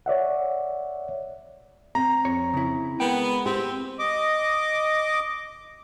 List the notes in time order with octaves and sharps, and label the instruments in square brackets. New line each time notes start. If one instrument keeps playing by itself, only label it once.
[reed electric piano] C#5 D5 E5 F#5
[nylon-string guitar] C4 [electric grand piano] A#5
[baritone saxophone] F2 [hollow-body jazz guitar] C#5
[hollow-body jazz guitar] C#3 E4
[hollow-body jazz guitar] G#3 A#4 G5 [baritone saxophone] B3
[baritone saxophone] C4 [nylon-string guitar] G4
[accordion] D#5 D6